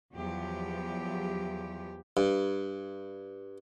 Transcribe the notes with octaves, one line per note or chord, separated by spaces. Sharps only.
E2 F3 F#3 G4
G2